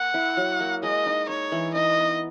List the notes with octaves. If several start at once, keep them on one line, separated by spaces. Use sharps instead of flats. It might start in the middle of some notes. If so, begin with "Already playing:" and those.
Already playing: A#3 F#5
E4
F#3
A#3
G#3 D#5
D#4
D#4 C#5
E3
D#4 D#5
B3